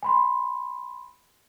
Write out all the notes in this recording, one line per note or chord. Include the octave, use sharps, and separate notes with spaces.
G#5 B5 C6